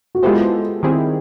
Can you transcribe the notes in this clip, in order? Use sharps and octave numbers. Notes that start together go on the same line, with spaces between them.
F#4
G#3 B3 E4 F4 G4 A4 C5
D#3 G3 C4 E4 G#4